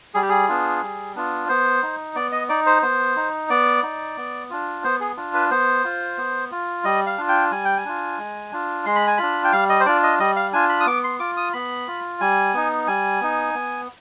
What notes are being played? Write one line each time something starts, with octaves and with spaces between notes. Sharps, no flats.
G3 G#4
G4
G#4
B3 D4 F4
G3
B3 D4 F4
B3 C5
D#4
B3 D5
D#5
D#4 D5
C5
B3 C5
D#4
B3 D5
D#4
B3
D4 F4
B3 C5
G#4
D4 F4
B4
B3 C5
F4
B3
F4
G3 D#5
F5
D4 F4
G5
G3 G#5
G5
G#5
D4 F4
G#3
D4 F4
G#3 C6
B5
G#5
D4 F4 B5
G5
G3 F5
D#5
C5
D4 F4 D5
D#5
G3 D#5
F5
D4 F4 G#5
B5
D#6
B3 D6
C6
F4 D6
D#6
B3 B5
F4
G3 G#5
B3 D#4
G3 G#5
B3 D#4
B3